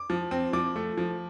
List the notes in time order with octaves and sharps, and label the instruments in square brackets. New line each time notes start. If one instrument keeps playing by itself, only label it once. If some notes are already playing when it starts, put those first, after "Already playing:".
Already playing: [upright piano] D6
F3
C4
F3 D6
A3
F3